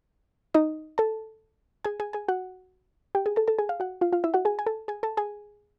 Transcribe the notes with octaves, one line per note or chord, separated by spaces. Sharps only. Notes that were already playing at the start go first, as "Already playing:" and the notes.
D#4 D#5
A4 A5
G#4 G#5
G#4 G#5
G#4 G#5
F#4 F#5
G4 G5
G#4 G#5
A4 A5
A4 A5
G#4 G#5
F5
F#4 F#5
F4 F5
F4 F5
E4 E5
F#4 F#5
G#4 G#5
G#5
A4 A5
G#4 G#5
A4 A5
G#4 G#5